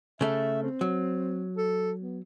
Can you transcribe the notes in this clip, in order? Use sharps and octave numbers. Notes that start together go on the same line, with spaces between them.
C#3 A3 E5
C4
F#3
A4
B3